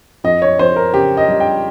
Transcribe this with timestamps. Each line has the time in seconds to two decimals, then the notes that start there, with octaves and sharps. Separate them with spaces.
0.24 F2 D#5
0.42 C#5
0.59 F2 C5
0.76 A#4
0.93 C#3 G4
1.17 D#5
1.28 G3
1.40 G5